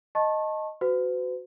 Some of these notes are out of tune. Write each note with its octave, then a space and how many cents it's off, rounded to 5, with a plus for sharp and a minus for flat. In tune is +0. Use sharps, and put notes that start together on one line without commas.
D#5 +0 A5 +0 C#6 -35
F#4 +0 B4 +45